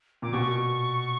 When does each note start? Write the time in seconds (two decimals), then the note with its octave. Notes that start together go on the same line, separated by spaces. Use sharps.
0.22 A#2 D6
0.33 B2 C#6